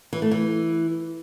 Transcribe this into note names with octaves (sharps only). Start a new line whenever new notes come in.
E3
A3
E3